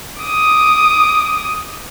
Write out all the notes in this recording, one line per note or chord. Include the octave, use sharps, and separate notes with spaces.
D6 D#6